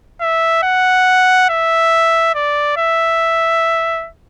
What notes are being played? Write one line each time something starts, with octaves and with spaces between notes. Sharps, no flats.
E5
F#5
E5
D5
E5